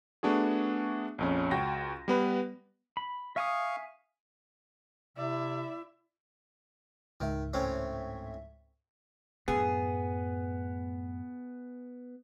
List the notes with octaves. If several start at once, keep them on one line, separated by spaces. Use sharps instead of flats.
A3 B3 D4 F#4 G#4
A#1 F2 C#4
C#2 F#4 G5 A#6
G3 B3 B4
B5
E5 F5 G#5 C#6 D#6
C3 E4 D5 E5
C#2 G#2 D#3 E5
A2 C4 C#4
F#2 A2 B3 G#4